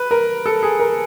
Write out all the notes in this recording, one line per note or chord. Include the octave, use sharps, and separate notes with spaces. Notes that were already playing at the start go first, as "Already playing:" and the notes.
Already playing: B4
A#4
A4
G#4
A#4